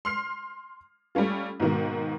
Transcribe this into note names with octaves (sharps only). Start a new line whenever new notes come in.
C6 F6 C7
G3 A3 C#4 F4
G#2 B2 D#3 A#3